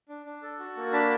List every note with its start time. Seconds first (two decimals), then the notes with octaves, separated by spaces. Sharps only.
0.09 D4
0.26 D4
0.42 A4
0.59 F#4
0.76 A#3
0.93 D4 A5 B5